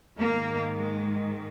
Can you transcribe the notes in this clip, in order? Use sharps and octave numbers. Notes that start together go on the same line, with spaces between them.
G#2 D#3 A#3
G#3